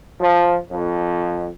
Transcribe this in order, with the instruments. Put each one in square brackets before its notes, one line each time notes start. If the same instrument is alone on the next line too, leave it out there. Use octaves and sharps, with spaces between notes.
[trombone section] F3
F2